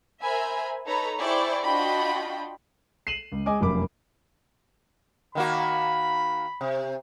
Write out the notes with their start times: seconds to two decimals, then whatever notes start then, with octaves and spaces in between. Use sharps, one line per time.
0.23 A#4 C5 E5 G#5 B5
0.86 D#4 A4 B4 C#5 A#5 B5
1.19 E4 G#4 C5 D5 G5 C#6
1.65 D4 F4 F#4 D#5 G5 B5
3.07 C7 D#7 E7 F#7
3.32 C#2
3.46 G#3 D#5 G#5 D6 D#6
3.61 F1 F#2 A#3 B5 D6
5.35 D#3 A#3 F#4 B5
6.61 C3